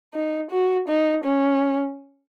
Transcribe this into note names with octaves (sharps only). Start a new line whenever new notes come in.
D#4
F#4
D#4
C#4